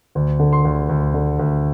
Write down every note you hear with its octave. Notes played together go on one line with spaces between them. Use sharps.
D2
D3
C6
D2
D2
D3
D2